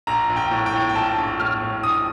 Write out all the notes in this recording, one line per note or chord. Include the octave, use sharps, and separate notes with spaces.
A#1 A#5
A#1
G5
A2
G5
A2
G5
A#1 A5
A#1
A2 F6
A2
A#1 D#6